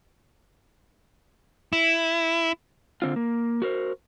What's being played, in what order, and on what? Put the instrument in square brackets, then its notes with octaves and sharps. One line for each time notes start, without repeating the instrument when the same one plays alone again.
[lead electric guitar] E4
[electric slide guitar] D3 C4 F4
A#3
F#4 A#4 C5